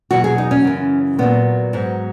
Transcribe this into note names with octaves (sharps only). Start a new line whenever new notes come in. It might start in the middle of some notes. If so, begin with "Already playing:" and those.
E2 B2 F#3 F#4
G#4
D#4
C#4
F#2 C#3 E3
A#2 F#3 B3
G#2 F#3